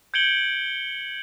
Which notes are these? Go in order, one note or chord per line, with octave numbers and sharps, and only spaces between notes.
G6 G#6 C#7 D7 F#7 G7